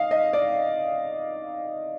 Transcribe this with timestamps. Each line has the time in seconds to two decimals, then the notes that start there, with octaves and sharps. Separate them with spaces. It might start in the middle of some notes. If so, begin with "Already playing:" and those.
Already playing: D#5 F5
0.11 D#5
0.33 D5